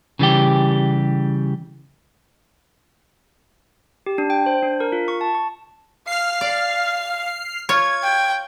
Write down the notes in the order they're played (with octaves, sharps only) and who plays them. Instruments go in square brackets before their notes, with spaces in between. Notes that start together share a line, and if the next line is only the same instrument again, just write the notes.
[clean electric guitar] C#3 E3 G3 G4
[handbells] G4
D4
G5
C5
D4
A#4
F4
C#6
A5
C#6
[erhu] F5 [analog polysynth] F6 C7
[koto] D5
[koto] F4 C#5 [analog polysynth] G#6
[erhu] G5